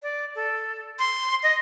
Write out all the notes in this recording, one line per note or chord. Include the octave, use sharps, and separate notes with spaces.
D5
A4
C6
D#5